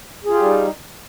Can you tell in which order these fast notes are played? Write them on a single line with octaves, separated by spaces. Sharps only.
G#4 F4 G4 G3 D#4